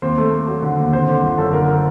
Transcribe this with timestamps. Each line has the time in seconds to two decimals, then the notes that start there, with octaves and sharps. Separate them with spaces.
0.02 D#2 C4 C5
0.18 A3
0.33 A3
0.48 F#3
0.62 D3
0.78 D#2
0.93 D3 C4 C5
1.08 D3
1.23 G1
1.38 F#2 A4
1.53 D3 A#4
1.68 A#4